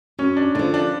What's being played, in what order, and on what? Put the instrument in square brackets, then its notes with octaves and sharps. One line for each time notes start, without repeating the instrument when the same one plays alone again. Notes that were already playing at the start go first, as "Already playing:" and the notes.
[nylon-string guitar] F#2 [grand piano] C#4
[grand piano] D4
[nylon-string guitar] D3 F3 [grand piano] D4
[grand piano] D4